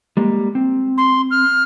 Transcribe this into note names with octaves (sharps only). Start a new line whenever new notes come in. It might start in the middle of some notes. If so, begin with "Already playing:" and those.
G3 G#3 A#3
C4
C6
F6